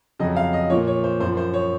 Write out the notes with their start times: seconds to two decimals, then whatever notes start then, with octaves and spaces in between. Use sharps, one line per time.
0.19 F2 C#3 F#3 D#5
0.36 F5
0.53 D#5
0.70 A#2 F3 C#5
0.87 C#5
1.04 C5
1.20 F#2 C5
1.25 F3
1.37 C5
1.54 C#5